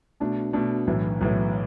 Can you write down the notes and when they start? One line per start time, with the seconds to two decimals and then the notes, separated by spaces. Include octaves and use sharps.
0.20 B2 A3 D4
0.53 B2 A3 D4
0.87 B1 A2 E3
1.21 B1 A2 E3